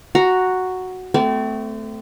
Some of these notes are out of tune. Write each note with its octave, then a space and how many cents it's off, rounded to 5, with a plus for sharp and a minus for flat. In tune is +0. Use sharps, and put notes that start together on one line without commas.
F#4 +0 A#5 +0
A3 +0 C4 -35 D5 -40